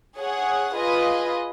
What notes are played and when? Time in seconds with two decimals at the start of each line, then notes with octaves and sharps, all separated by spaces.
0.17 G#4 C#5 F#5
0.74 F4 G#4 B4 D#5